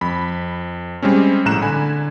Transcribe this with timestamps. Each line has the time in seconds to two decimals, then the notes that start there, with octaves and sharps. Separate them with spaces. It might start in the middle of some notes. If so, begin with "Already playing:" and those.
0.01 F2 B5
1.02 G3 G#3 C4 C#4
1.45 A#1 A2 A#5 F#6 E7
1.62 D3 G#5 B5